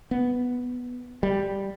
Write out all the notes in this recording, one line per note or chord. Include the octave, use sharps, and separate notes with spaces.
B3
G3